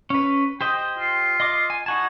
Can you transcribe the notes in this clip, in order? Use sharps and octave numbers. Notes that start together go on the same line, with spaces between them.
C#4 B4
G4 C5 D#5 G5
F4
D#5 C6 D6
G#5
D#4 F#4 G#5 A5